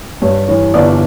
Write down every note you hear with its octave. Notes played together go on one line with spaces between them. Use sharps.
G2 C#5
E3 C#5
G1 D5